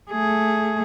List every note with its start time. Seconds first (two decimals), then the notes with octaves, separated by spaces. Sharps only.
0.11 A3 G#4